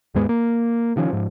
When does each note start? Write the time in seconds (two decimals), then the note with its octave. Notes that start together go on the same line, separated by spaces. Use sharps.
0.14 D#2 G#2 G#3 B3
0.29 A#3
0.96 C3 D#3 F3 C#4
1.10 G#2 F3